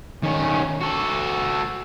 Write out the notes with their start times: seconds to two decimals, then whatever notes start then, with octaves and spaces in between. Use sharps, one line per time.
0.23 D#3 C#4
0.81 F#4 A4